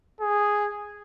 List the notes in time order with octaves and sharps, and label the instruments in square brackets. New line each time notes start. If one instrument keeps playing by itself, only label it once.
[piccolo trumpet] G#4